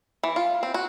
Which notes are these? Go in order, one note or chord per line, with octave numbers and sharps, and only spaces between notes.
E3
F4
C4
F#4